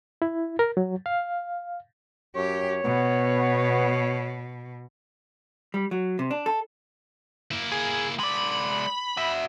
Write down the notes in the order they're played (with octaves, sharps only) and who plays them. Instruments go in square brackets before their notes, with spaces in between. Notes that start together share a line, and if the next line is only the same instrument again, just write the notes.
[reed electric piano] E4
A#4
F#3
F5
[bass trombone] F#2 [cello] G4 [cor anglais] C#5
[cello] B2 [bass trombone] B3
[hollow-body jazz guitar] G3
F#3
C3
D4
A4
[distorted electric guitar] A#3 E4
[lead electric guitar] G#4
[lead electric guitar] G#3 D5 [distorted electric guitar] B5
[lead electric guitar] F#4 E5